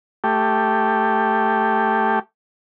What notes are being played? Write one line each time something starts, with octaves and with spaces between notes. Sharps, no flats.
A3 G4